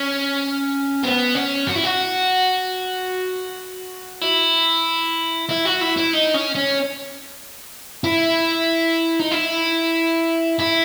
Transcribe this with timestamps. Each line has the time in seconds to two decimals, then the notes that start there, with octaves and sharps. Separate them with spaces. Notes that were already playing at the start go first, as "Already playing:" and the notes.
Already playing: C#4
1.03 B3
1.35 C#4
1.67 F#4
1.75 E4
1.84 F#4
4.21 E4
5.49 E4
5.65 F#4
5.81 E4
5.97 E4
6.13 D#4
6.34 C#4
6.55 C#4
8.04 E4
9.19 D#4
9.31 E4
10.59 E4